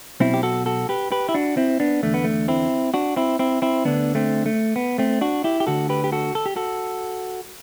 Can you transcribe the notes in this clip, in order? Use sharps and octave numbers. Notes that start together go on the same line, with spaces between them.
B1 B2 C4 E4
G4
F#4 A4
F#4 A4
G4 B4
G4 B4
E4
D4 F#4
C4 E4
B3 D4
E2 D3 A3
B3
A3
C4 E4
D4 F#4
C4 E4
C4 E4
C4 E4
D2 D3 B3 D4
A3 C4
A3
B3
A3 C4
D4 F#4
E4 G4
G4
D2 D3 F#4 A4
G4 B4
G4
F#4 A4
A4
G4
F#4 A4